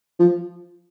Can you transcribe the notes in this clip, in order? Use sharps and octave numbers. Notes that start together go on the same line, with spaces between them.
F3